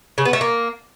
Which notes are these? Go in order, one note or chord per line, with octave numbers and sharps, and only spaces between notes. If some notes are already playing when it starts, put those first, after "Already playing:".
C#3
B3
A3
A#3